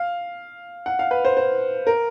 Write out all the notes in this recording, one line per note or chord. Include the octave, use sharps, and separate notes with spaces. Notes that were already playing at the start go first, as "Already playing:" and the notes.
Already playing: F5
F#5
F5
B4
C5
C5
A#4